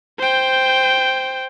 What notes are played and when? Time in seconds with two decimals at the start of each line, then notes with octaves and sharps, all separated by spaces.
0.19 C5 G5